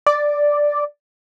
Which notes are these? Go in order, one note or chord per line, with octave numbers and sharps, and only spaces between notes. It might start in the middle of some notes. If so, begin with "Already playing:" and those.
D5